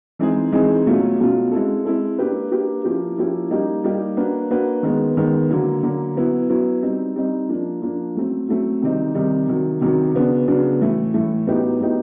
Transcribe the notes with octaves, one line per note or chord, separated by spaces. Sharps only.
E3 G#3 C4 D#4 G#4
E3 G#3 C4 D#4 G#4
B2 F#3 A3 C#4 F4
B2 F#3 A3 C#4 F4
G#3 C4 E4 A4
G#3 C4 E4 A4
A#3 D4 G4 B4
A#3 D4 G4 B4
F3 A#3 C#4 E4 G4
F3 A#3 C#4 E4 G4
G3 A#3 D#4 G4
G3 A#3 D#4 G4
A#3 D4 F#4 B4
A#3 D4 F#4 B4
D#3 G#3 B3
D#3 G#3 B3
D3 F#3 A#3
D3 F#3 A#3
F#3 B3 E4
F#3 B3 E4
G3 C4 D#4
G3 C4 D#4
F3 A#3 D4
F3 A#3 D4
F#3 A3 C4
F#3 A3 C4
C3 D#3 G3 C4 D#4
C3 D#3 G3 C4 D#4
C3 D#3 F#3
C3 D#3 F#3
C#3 F#3 B3 D4
C#3 F#3 B3 D4
A2 E3 A3
A2 E3 A3
A2 F#3 B3 D#4 G4
A2 F#3 B3 D#4 G4